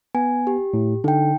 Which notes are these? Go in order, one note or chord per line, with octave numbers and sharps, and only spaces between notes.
B3 G#5
G4
A2
D3 D#4 G5